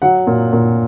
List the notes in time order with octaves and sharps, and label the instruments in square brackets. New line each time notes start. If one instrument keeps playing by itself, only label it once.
[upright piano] F#3 F#5
A#2
A#2